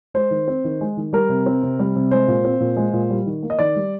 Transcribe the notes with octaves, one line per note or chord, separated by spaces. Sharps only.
G#3 C5
D#3
C4
D#3
G#3
D#3
G3 A#4
C3
C4
C3
G3
C3
G#3 C5
A#2
C4
A#2
G#3
A#2
G3
D#3
A#3
D#5
D#3 D5
G3